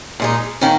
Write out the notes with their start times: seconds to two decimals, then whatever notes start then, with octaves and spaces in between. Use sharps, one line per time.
0.20 A#2 G#3 D#4
0.61 D#3 A#3 C#4